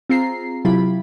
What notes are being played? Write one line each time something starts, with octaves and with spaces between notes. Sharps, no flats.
C4 F4 G#4 A#5 C7
C3 F#3 E4 F4 G4 B5